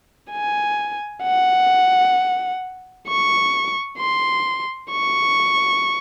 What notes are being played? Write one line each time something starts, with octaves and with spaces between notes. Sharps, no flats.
G#5
F#5
C#6
C6
C#6